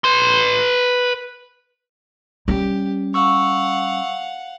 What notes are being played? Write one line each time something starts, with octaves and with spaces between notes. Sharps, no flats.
B4 C6
G3 C#4 G4
F5 F#5 C#6 E6